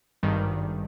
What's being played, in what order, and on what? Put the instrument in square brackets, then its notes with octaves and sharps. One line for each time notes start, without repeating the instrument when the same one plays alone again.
[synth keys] G#1 G2 D#3 G3